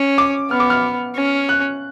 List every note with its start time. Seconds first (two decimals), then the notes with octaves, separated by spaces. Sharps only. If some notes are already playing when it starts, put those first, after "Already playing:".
Already playing: C#4
0.18 D6
0.50 B3 F6
0.60 D6
0.70 F6
1.16 C#4
1.49 F#6